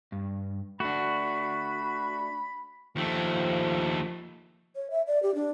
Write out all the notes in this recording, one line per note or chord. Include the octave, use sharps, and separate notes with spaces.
G2
A3 D4 F#4 B5
D#2 F3 A3
C#5
E5
D5
G4
D4